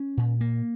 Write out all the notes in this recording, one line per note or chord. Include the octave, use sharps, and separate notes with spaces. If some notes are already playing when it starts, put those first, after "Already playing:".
Already playing: C#4
A#2
A#3